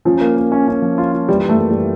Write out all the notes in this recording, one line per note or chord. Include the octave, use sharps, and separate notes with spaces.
F3 C#4
A#3
A#3
C#4
C#4
F3
F4
F4
E3 G3
E3
A3
A#3
G3
E3